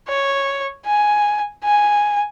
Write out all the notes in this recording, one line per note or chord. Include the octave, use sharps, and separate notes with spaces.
C#5
G#5
G#5